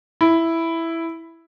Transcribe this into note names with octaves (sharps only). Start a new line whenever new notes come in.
E4